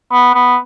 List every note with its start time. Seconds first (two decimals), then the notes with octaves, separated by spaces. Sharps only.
0.12 B3
0.34 B3